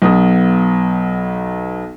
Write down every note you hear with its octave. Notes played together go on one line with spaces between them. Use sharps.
B1 B3 D#6